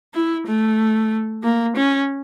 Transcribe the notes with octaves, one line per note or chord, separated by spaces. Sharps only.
E4
A3
A#3
C#4